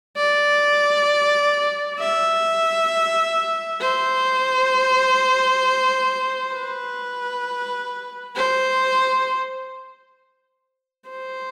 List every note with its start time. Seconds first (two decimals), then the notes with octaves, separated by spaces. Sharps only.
0.17 D5
1.99 E5
3.81 C5
6.54 B4
8.37 C5
11.10 C5